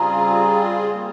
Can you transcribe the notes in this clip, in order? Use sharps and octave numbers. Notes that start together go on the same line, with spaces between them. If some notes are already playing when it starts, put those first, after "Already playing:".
Already playing: C#3 G3 C4 F4 G#4 A#5
G3 A#3